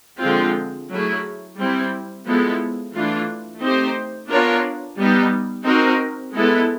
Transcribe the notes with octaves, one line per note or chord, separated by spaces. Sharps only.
D3 F3 G#3 C4 F4
F#3 A3 C#4 E4 G#4
G3 C4 E4
F3 G#3 B3 E4 A4
E3 A3 D4 F4
A3 C4 D#4 G4 C5
B3 D4 F4 A#4 C#5
G3 B3 D#4
C4 D#4 F#4 A#4
G#3 B3 E4 A4